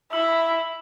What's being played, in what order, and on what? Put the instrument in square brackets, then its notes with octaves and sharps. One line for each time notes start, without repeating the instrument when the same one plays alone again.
[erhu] E4 [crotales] E6